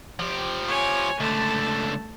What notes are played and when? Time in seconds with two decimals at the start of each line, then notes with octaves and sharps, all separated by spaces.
0.20 F3 G4
0.68 C#5 G#5
1.20 C#2 D3 A3 A5